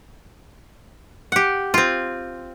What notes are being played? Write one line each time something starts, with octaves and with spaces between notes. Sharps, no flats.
G4 F#5
C4 F4